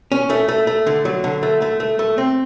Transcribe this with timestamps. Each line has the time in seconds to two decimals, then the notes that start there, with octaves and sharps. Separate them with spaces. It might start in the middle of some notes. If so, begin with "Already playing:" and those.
0.12 C#4
0.30 A3
0.49 A3
0.67 A3
0.87 D3
1.05 F#3
1.24 D3
1.43 A3
1.62 A3
1.80 A3
1.99 A3
2.18 C4